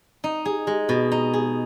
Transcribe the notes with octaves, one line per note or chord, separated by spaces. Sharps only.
D#4
G#4
G#3
B2
D#4
G#4